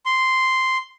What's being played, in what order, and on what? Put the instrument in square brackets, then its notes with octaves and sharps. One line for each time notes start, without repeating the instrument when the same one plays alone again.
[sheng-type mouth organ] C6